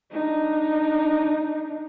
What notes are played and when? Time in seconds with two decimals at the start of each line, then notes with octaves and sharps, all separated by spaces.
0.11 D4 D#4